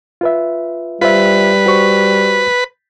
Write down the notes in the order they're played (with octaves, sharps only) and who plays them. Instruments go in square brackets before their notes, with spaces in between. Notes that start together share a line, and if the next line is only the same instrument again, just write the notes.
[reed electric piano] F4 B4 E5
[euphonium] G3 [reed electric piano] F4 C5 E5 [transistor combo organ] B4
[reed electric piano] F#4 C5 C#6